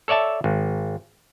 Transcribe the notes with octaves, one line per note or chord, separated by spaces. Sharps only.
A4 C#5 D5 E5 A5
G#1